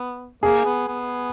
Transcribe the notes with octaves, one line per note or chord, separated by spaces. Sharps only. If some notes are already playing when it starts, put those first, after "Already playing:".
Already playing: B3
A#3 G#4
B3
B3